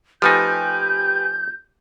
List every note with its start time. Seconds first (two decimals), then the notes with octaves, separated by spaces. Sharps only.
0.22 F3 A3 D#4 G4 B4 G#5 G6